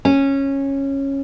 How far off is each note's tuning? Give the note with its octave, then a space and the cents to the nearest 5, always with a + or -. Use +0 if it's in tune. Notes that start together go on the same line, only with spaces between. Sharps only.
C#4 -10